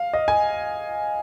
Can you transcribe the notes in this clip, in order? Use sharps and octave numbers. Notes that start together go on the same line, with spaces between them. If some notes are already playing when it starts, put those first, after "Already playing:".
Already playing: F5
D#5
G#5